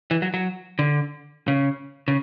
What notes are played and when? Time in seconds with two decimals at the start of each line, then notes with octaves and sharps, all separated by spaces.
0.11 E3
0.22 F#3
0.34 F#3
0.79 D3
1.48 C#3
2.08 C#3